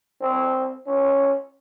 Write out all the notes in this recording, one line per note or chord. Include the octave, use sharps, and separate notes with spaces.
C4
C#4